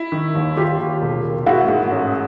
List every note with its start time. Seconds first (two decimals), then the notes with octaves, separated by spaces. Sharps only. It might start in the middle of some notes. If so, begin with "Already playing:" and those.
Already playing: E4
0.12 D#3
0.35 D#2
0.57 D#2 F4 G4
0.79 D#2
1.01 E1
1.25 E1
1.46 G#2 E4 F#4
1.68 G#2
1.91 A1